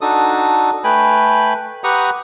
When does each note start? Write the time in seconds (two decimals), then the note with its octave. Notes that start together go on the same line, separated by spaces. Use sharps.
0.01 D4 D#4 F#4 A4 D#6
0.84 A3 B4 G5 G#5 B5
1.84 G4 B4 F#5 A#5 C#6 D#6